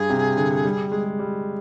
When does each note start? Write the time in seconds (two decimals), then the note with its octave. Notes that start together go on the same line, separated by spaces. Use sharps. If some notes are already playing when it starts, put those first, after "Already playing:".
Already playing: G2 G#4
0.10 C3
0.37 D3
0.65 G3
0.92 G#3
1.19 G3